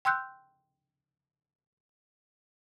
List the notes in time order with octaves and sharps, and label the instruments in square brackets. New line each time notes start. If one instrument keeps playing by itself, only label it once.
[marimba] G5 C6 E6 F#6 G6